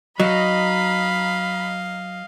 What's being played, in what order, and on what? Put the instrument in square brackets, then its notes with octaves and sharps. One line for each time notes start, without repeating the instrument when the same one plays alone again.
[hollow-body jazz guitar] F#3 [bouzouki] D#4 [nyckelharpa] D#5 F5 [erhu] B5